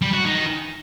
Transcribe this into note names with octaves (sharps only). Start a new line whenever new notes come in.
G3
F#4
D#3